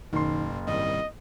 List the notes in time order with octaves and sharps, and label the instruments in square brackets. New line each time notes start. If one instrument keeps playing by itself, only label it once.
[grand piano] F#1 C6 [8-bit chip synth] B2 [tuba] D#3
[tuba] C2 [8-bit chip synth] G#2 D#3 G3 [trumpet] D#5